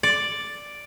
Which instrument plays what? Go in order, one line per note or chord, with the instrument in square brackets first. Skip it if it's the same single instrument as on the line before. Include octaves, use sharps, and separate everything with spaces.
[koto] D5